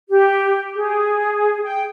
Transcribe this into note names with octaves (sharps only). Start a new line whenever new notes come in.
G4
G#4
G5